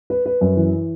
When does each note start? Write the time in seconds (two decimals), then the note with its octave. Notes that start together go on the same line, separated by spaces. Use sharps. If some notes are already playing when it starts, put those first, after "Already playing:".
0.10 B4
0.26 B4
0.41 F#2
0.57 E3